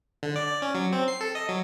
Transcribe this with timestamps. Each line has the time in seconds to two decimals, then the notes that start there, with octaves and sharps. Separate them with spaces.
0.23 D3
0.36 D5
0.48 D5
0.62 C#4
0.75 F#3
0.93 C4
1.08 C7
1.21 A4
1.35 D#5
1.49 F#3